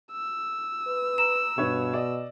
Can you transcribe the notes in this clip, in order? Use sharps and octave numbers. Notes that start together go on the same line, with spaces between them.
E6
B4
A#5 E7
G2 B2 B4 C#5
D5 D#5